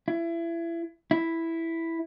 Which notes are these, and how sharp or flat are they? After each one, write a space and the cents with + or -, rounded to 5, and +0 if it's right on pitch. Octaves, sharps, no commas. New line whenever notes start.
E4 +30
E4 +0